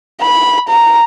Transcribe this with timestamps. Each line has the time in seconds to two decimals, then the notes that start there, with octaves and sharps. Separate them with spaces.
0.21 B5
0.69 A#5